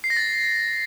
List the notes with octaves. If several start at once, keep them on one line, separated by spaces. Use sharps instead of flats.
C7
A#6
A6